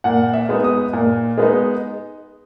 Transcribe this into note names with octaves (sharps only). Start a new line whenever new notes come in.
A#2 F#5
E5
G#3 B3 D#4
D#6
A#2
G#3 B3 D#4